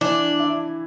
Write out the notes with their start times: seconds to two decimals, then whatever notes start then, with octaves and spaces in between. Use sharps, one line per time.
0.01 E3 D4
0.39 E4